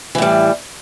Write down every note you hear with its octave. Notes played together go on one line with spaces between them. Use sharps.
A2 E3 G3